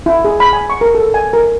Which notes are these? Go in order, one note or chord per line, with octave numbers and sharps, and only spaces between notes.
E4
G#4
B5
G#5
C#6
A#4
A4
G#5
A#4